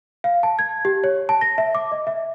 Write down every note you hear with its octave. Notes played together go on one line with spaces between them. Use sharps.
F5
A5
G#6
G4
C#5
A5
A#6
E5
D6
D#5
E5